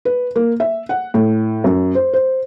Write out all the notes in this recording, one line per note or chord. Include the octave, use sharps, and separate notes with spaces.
B4
A#3
E5
F#5
A2
F#2
C5
C5